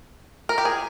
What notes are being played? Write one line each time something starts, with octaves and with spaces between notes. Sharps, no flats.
A#4
G4
G#4